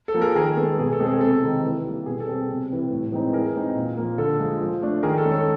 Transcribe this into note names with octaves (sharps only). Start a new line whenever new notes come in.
A4
F3 A#3
G#4 A#4
D#3 G#4 A#4
B3 A4
G#3
B2 G#4
A4
G#3 C4 G#4
A4
C3 A4
D#3 G#3 C4 D#4
E3
G3 A#3
B2 G#4
A4
G3 C4
G#4
C3
E3 G3 C4
A2
E3 G#3 C4 D#4
E3 G#4 A#4
G#3 C4 D#4
A#2
F3 A#3
D3 A4
F3 G#3
F3
A3 D4
D#3 G#4 A#4
A4
G#3 C#4
A4